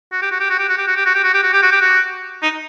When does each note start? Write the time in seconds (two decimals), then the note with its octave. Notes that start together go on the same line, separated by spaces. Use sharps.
0.12 F#4
0.22 G4
0.32 F#4
0.40 G4
0.50 F#4
0.59 G4
0.69 F#4
0.78 G4
0.88 F#4
0.97 G4
1.06 F#4
1.15 G4
1.24 F#4
1.34 G4
1.43 F#4
1.53 G4
1.63 F#4
1.72 G4
1.81 F#4
2.43 D#4